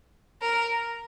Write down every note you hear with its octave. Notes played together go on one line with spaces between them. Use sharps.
A#4